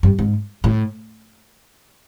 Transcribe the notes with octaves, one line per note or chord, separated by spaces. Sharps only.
G2
G#2
A2